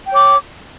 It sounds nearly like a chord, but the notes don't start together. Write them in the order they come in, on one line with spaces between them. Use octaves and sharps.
G5 C#5 D6